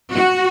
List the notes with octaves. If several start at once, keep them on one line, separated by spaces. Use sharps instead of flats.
F#4